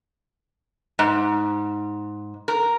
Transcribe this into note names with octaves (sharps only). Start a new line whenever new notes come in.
G#2
A#4